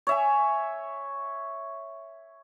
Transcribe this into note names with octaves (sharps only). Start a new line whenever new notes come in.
C#5 E5 G#5